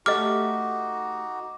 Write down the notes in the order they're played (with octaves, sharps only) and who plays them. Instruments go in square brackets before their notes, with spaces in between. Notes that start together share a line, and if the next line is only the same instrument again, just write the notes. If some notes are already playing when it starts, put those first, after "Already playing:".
[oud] A3 G4 A4 [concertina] D#4 F#4 [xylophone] D#5 F6 [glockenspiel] D6